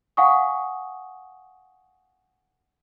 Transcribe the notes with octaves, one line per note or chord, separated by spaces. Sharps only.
F5 F#5 G#5 C#6 D#6